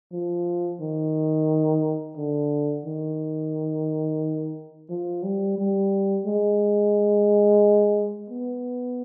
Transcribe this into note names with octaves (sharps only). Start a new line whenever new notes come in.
F3
D#3
D3
D#3
F3
G3
G3
G#3
B3